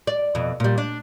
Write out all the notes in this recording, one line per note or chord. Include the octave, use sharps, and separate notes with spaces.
D5
F2 B2
A#2 G3
D4